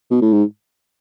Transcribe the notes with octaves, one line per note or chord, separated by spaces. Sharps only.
B2
A2
G#2